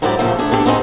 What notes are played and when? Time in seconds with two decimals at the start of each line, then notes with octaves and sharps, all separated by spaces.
0.02 G#2 F#3 E4 G4 A4 D5
0.18 E2 A#2 C#3 F3 A3
0.39 A3 D4 G#4
0.52 D4 E4 G4 A4 D5
0.66 B3 C4 D#4 F#4 G#4